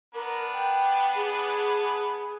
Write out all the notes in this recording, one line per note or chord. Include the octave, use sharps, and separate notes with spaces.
B3 D4 A#4 B4
G5
G#4